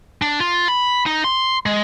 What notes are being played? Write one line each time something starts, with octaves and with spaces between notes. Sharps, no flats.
D4
F4
B5
D#4
C6
G#3